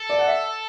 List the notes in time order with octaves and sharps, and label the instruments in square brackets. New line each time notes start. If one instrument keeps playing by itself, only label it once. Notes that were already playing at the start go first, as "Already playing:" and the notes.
Already playing: [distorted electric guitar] A4
[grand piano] D5
F#5
E5